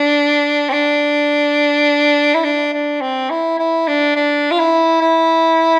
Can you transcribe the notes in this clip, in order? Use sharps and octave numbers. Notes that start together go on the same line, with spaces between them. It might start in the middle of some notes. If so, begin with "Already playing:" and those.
Already playing: D4
C4
D4
E4
D4
D4
C4
E4
E4
D4
D4
F4
E4
E4